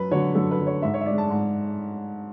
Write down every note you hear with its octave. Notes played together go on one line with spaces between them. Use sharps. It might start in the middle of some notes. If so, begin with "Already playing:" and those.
Already playing: F#2 B4
D3 F#3 C#5
F#2 A4
B4
D3 F#3
C#5
G#2 E5
C#5
E5
G#3 D4 D5
A5
G#2